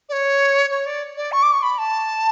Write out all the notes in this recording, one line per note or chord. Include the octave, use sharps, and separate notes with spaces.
D5
C#5
C#5
D5
D5
C#6
D6
C#6
B5
A5